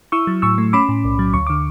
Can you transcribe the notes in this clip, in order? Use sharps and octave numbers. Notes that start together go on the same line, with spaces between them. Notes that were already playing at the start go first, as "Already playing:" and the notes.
E4 C#6 E6
F#3
A2 C#6 E6
A3
C#4 B5 D6
A2
B1
F#3
D2 C#6
D3 D6